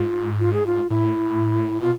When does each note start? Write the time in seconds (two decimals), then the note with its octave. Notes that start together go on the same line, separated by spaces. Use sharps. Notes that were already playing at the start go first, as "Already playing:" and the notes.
Already playing: G#2 F4
0.39 F4
0.53 G#4
0.66 F4
0.90 A2 E4
1.81 B2 F4